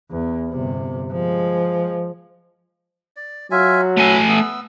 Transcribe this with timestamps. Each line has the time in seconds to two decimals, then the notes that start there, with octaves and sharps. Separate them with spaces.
0.11 E2
0.49 G1 C3
1.12 F3 G#3
3.16 D5
3.51 F#3 F4 E5 G#5
3.97 A3 B4 E5 G#5
4.28 B3 E6